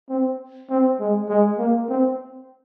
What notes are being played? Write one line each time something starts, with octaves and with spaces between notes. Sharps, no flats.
C4
C4
G#3
G#3
A#3
C4